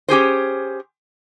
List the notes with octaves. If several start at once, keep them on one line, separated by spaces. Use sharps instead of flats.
C#4 G4 G#4 C5